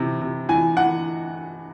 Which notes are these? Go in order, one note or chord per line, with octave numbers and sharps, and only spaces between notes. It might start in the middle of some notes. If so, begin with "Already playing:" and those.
Already playing: C3 E3
C3
E3 G#5
E3 F#5